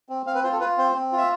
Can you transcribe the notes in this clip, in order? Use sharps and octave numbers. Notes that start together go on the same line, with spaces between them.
C4
C4 F5
B4
F4 C5
A4
F4 B4
C4 C5
C4
F4
E5